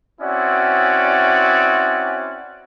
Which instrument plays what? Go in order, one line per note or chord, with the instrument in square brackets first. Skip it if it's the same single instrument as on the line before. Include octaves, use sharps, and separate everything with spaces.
[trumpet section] C4 C#4 E4 F#4 D5